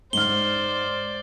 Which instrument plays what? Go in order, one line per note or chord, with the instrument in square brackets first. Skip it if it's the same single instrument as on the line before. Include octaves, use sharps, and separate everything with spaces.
[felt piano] G#2 F6 [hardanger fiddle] C5 D5 [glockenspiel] G7